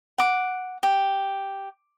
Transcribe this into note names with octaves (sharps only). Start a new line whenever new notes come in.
F#5 D6
G4